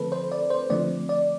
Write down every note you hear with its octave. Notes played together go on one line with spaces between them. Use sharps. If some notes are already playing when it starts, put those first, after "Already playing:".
Already playing: D3 F3 A3 C4 A4 B4
C5
D5
C5
D3 F3 A3 C4 D5
D5